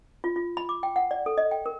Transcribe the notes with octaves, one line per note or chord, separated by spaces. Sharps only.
F4
F4
B5
D6
G5
F#5
D5
A4
D#5
G5
A#4